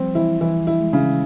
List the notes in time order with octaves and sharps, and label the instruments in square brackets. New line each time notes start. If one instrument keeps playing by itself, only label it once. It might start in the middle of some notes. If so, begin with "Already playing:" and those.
Already playing: [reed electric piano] F3 G3 [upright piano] C4
[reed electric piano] E3 [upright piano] E4
[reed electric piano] E3 [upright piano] E4
[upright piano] E4
[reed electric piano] G#3
[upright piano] C#3